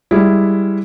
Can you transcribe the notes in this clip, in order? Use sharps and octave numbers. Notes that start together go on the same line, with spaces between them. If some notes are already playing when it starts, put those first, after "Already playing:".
G3 G#3 E4